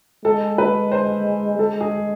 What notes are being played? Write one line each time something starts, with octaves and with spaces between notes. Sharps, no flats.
G#3 A4
B4
C5
G#3 A4
G#4